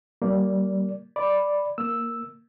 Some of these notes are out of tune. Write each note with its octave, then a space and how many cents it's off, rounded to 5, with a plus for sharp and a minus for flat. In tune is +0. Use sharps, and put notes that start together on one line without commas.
G3 -35 A#3 +0 D5 -15
D5 +0 B5 +0
A#3 +0 E6 +0